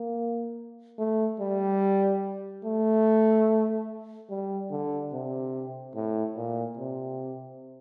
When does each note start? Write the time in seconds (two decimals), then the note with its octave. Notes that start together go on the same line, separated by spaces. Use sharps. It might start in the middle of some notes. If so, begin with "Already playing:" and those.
Already playing: A#3
0.99 A3
1.40 G3
2.64 A3
4.30 G3
4.71 D3
5.13 C3
5.95 A2
6.37 A#2
6.78 C3